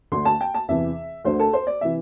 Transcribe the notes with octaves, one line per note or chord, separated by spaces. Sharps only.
D2 D3 C6
A5
G5
A5
E2 C3 E3 E5
D2 D3 C5
A4
C5
D5
C3 E3 E5